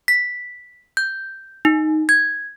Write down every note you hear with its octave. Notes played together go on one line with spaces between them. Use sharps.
B6
G6
D#4
G#6